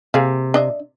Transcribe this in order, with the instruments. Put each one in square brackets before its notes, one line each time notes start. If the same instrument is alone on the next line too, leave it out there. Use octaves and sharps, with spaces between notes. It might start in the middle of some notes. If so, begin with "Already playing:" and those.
[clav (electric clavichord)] C3 [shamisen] A#3 G#4 F5
[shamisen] D4 D#5 E5